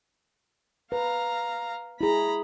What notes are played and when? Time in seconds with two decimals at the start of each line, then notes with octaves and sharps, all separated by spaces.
0.92 B4 F5 A#5
2.01 E4 G#4 A#5 B5